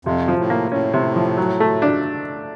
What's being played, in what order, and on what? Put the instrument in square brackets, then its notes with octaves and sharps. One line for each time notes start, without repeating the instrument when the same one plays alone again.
[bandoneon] F2 [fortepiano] C3
[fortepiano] F3
[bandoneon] A2
[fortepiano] A#3
[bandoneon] A2 [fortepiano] C#4
[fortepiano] C3
F3
F#3
A3
D4